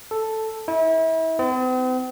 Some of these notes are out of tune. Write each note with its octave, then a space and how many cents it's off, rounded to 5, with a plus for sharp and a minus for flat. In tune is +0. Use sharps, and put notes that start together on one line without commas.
A4 +0
E4 -35
C4 -45